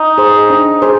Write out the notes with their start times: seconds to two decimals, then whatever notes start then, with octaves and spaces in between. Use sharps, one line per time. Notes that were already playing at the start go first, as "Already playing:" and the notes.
Already playing: D#4
0.18 G#4 C5
0.50 D4
0.82 G#4 C5